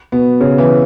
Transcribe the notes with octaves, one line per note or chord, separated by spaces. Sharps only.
B2 B3
C#3 C#4
E3 E4